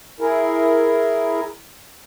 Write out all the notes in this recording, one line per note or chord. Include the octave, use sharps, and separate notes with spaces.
E4 G#4 A#4